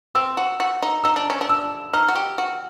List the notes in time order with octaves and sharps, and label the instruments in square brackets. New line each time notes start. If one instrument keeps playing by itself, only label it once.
[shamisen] C4 [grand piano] E6
[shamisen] F#4
F#4
D#4
[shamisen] D#4 [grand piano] E6
[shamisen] D4
C#4
D4
[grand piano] E6
[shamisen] D#4 [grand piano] F6
[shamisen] F#4
G4
F#4